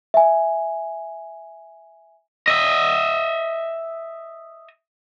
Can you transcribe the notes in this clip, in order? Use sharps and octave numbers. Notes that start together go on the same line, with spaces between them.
E5 G#5
D#5 E5